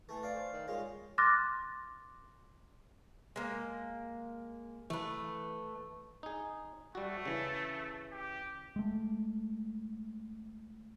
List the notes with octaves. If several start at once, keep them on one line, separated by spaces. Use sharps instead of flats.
E3 A3
D5 F5
C5
D#3
G#3 F4 C#5
C6 D6 F6 F#6 A6 A#6
G#3 A#3
E3 A3 B4
D#4 G#4
G3 A3 F#4
C#3 E3
G4
G#3 A3